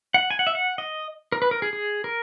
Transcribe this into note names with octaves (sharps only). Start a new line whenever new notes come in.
F#5
G#5
F#5
E5
F#5
D#5
A#4
B4
A#4
G#4
G#4
A#4